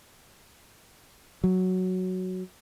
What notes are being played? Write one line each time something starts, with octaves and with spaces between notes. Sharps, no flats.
F#3